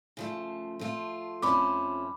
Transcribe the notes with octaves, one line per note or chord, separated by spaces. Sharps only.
C#3 F3 A3
F3 A3 F4
F2 F3 A3 C#4 B5 D6